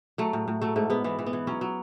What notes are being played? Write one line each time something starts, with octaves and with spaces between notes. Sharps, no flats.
F#3 A3
A2
A2
F#3 A3
G#2 A3
G#2 B3
E3 B3
E3
B3
E3
F#3 C#4
F#3